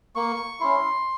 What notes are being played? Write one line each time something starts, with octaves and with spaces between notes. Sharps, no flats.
A#3 C#6
C#4 E4 C6